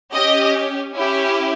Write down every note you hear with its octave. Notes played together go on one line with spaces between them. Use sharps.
C#4 G4 D#5
C#4 E4 G4